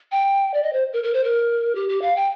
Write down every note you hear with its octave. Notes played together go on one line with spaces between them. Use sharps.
G5
D5
D#5
C5
A#4
A#4
C5
A#4
G4
G4
F5
G5